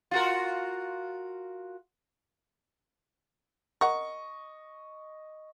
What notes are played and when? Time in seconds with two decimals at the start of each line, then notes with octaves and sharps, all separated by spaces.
0.11 F4 F#4 A#4
3.81 A#4 D#5 F#5 C#6